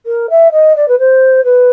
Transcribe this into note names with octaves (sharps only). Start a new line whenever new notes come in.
A#4
E5
D#5
D5
B4
C5
B4